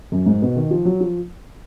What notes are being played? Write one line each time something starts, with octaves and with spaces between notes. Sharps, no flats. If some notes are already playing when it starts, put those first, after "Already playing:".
F#2
G#2
B2
D#3
F3
F#3
F3